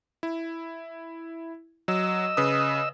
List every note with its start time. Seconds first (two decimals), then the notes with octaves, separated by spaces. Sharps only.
0.23 E4
1.88 F#3 D#5 E6
2.37 C#3 B4 D#6